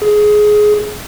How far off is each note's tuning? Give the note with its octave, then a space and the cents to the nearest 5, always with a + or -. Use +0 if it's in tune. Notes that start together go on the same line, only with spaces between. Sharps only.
G#4 +15